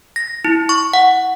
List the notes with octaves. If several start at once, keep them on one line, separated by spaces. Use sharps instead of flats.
A#6
E4
C#6
F#5